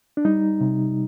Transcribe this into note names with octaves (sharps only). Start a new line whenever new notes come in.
D4
G3 D#4
C3